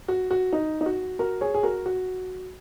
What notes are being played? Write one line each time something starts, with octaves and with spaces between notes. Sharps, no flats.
F#4
F#4
D#4
D#4
F#4
F#4 A#4
G#4 C#5
G#4
F#4 A#4
F#4